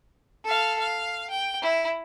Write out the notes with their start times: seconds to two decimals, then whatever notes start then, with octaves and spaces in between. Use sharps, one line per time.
0.44 A4 F5
0.80 F5
1.30 G5
1.62 E4